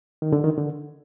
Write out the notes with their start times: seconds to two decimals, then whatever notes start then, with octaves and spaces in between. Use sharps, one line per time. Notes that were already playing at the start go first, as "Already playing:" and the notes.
0.22 D#3
0.33 D3
0.44 D#3
0.58 D3